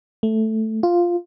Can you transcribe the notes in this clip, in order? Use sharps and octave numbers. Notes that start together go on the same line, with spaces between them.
A3
F4